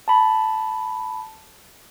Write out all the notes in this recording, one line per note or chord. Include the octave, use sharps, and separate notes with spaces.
A5 B5